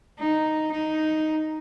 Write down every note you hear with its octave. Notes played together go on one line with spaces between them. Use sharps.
D#4
D#4